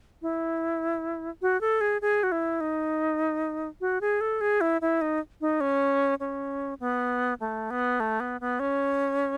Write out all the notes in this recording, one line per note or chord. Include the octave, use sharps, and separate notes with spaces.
E4
F#4
A4
G#4
G#4
F#4
E4
D#4
F#4
G#4
A4
G#4
E4
E4
D#4
D#4
C#4
C#4
B3
A3
B3
A3
B3
B3
C#4